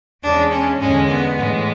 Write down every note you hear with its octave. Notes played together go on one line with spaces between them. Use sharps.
E2 C#3 G#3 D4
C#4
E2 D3 G#3 C#4
B3
A2 E3 G#3